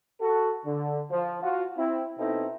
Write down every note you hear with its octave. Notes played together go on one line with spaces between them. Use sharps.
F#4 A4
D3
F3
F4 F#4
C4 E4
B2 C4 D#4 E4 A4